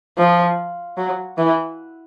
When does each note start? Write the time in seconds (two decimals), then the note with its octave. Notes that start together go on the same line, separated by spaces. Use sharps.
0.18 F3
0.97 F#3
1.37 E3